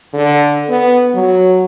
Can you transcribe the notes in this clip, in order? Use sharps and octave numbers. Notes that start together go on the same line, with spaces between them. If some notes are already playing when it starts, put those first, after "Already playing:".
D3
B3
F#3